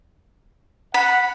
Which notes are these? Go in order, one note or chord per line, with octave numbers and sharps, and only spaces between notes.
F#5 B5